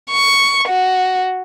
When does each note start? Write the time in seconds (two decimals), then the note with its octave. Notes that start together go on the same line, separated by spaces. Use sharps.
0.11 C#6
0.69 F#4